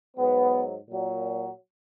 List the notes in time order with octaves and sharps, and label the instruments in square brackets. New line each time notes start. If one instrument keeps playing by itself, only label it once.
[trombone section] G#2 F#3 B3
A#2 F#3